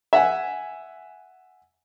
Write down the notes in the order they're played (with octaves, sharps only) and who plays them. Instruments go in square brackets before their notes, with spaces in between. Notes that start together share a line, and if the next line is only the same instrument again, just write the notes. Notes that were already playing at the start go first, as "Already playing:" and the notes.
[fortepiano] E5 F#5 G#5